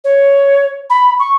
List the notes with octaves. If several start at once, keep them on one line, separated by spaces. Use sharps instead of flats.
C#5
B5
C#6